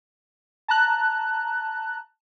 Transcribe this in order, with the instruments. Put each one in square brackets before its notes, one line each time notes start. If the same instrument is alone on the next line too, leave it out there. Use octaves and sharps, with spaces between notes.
[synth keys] A5 A#5 F#6